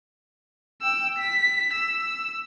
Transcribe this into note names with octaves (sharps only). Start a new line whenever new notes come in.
G5 E6
B6
E6